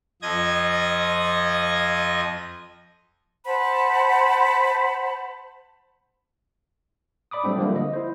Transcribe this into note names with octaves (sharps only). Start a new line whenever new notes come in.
F2 F3 D#5 G#6 A#6
C5 F#5 A5 B5
D5 B5 D6 D#6
F#3 G3 A3 C4 D4
D3 F3 G3 A3 A#3
D#5
E4 C5